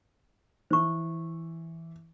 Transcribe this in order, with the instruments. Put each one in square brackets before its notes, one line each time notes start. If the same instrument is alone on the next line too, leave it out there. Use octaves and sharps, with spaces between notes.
[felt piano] E3 [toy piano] C5 C#6